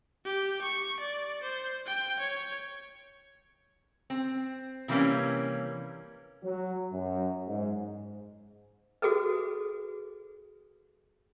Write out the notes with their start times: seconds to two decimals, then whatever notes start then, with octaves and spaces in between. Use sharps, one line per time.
0.25 G4
0.61 C#6
1.00 D5
1.43 C5
1.86 G5
2.19 C#5
4.10 C4
4.88 C3 E3 G3 A3 A#3 C#4
6.43 F#3
6.92 F#2
7.48 G#2
9.02 F#4 G#4 A4 B4